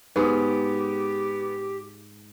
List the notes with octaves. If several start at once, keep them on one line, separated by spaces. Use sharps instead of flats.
G#2 B3 G4 G#4